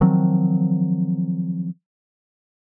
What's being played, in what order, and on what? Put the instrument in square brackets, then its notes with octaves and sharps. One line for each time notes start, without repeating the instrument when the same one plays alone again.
[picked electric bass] D#3 F3 F#3 C4